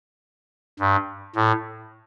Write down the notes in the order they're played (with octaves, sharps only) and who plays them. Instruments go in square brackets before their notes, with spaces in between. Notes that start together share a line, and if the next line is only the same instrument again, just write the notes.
[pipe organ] G2
A2